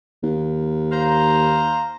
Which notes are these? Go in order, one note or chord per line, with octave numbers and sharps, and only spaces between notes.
D#2
C5 F5 A#5